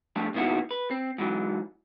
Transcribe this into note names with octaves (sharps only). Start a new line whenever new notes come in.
F3 G3 A3 D4
A#2 D#3 B3 E4 F#4
B4
C4
G#2 E3 F#3